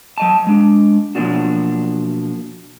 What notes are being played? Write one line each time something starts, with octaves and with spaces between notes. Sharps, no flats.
F#3 D#5 A5
G#3 D4
B2 F3 F#3 A#3 D4 F#4